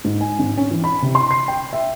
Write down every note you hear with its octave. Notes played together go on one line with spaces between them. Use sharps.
G#2
G#5
G#1
C#4
E3
B5
C3
C6
C7
G5
E5